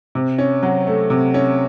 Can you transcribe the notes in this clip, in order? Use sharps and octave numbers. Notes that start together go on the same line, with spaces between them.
C3
C#4
F#3
A3
C3
C#4